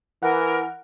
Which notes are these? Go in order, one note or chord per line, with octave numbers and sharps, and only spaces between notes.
E3 A#4 F#5